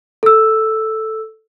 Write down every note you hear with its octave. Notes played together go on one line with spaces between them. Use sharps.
A4 E6